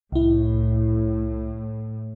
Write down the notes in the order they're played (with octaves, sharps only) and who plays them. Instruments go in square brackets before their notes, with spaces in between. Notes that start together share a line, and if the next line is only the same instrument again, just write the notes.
[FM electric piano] C2 E4 [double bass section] A2